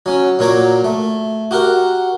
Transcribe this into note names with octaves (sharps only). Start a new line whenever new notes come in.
F#3 C#4
A#2 F#3 C#5 A#5 D6
A3
F#4 G4 A#4 F#5